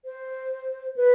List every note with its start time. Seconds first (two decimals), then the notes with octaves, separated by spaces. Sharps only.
0.05 C5
0.96 B4